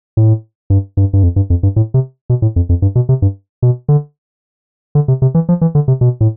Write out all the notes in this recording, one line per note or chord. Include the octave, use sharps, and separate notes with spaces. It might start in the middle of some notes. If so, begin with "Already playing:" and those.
A2
G2
G2
G2
F2
G2
F2
G2
A2
C3
B2
A2
F2
F2
G2
B2
C3
G2
B2
D3
D3
C3
C3
E3
F3
E3
D3
C3
B2
A2